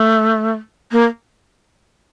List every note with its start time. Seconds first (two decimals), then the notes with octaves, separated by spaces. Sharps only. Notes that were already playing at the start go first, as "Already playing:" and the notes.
Already playing: A3
0.92 A#3